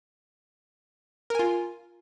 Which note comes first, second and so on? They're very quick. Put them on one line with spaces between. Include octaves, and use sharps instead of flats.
A#4 G#5 F4